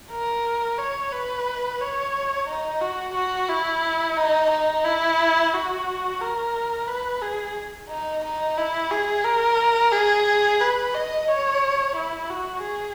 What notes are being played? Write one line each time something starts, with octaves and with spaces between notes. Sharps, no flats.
A#4
C#5
B4
C#5
D#4
F#4
F#4
E4
D#4
D#4
E4
F#4
A#4
B4
G#4
D#4
D#4
E4
G#4
A#4
G#4
B4
D#5
C#5
E4
F#4
G#4